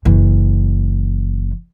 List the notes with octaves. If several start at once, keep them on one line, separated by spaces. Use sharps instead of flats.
F#1 E3